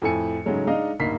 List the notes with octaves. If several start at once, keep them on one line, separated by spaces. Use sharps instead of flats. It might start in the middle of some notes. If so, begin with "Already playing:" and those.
F2 A2 A4 G#5 C#7
G#2 C#3 F#3 G#3 A3
G#3 D4 D#4 D#5 F5
D1 G2 A#3 D#4 B6 C7